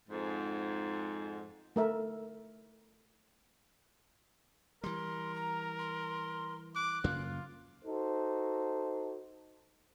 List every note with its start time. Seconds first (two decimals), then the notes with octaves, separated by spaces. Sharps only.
0.07 F2 G#2
1.76 A3 A#4 E5
4.84 E3 G3 A#4 C6
5.35 A#5
5.79 C6
6.75 D6 F#6
7.04 F#2 C#3 A#3 F4
7.85 D#4 F#4 A4 C5